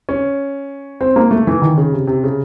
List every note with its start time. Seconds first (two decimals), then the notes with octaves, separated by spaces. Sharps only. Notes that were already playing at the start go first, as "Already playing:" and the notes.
0.09 C#4
1.01 C4
1.16 A#3
1.31 A3
1.47 E3
1.62 D#3
1.77 C#3
1.92 C3
2.07 C3
2.24 C#3